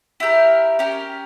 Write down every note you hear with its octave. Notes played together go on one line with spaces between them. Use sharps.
E4 G4 A#4
C#4 G4 A#4